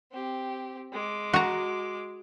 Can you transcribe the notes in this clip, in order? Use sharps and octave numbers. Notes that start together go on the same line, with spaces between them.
C4 G4
G#3 D6
F#4 A#5